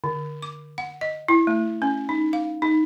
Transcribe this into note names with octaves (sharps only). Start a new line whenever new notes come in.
D3
D6
F#5
D#5
E4
A3
C#4
D#4
F5
D#4